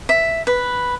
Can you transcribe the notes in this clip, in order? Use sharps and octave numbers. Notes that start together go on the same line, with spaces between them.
E5
B4